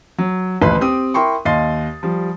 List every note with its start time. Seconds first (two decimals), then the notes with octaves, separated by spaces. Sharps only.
0.18 F#3
0.61 D#1 A1 D2 B4 C6
0.81 C4 G4 D#6
1.14 E4 A#4 G5 C6 C#6
1.45 D#2 D#5 F5 C6 A6 C7
2.03 F3 G3